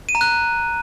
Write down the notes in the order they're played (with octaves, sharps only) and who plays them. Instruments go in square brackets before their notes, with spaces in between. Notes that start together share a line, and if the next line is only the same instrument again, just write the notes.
[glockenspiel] D#7
A#5
F#6